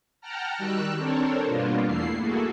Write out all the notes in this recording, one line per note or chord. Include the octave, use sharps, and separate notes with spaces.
F#5 G5 A5 A#5 F6
D#3 G3 F#4 E6 F#6
C4 D4 A4 A#4 C5 C#5
G2 B2 A#3 B3 D4 F4
E2 A3 A#3 E4 C7
A#3 E4 F#4 G#4 A4